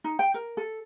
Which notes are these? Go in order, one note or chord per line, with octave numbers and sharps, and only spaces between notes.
D#4
G5
A#4
A4